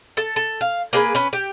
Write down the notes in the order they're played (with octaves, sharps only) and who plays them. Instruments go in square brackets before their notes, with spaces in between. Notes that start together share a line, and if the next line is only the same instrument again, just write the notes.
[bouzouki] A4 A5
A4
F5
A#3 G#4 B4
C#4 B4
G4